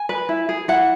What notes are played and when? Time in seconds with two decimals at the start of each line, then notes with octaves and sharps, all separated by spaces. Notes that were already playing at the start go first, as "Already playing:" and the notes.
Already playing: G#5
0.09 B4
0.29 E4
0.49 G#4
0.68 E4 F#5